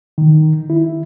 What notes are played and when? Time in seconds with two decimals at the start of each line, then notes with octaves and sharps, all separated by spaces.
0.18 D#3
0.70 E4